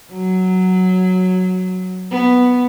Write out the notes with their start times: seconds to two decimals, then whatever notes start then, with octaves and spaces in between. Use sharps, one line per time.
0.11 F#3
2.11 B3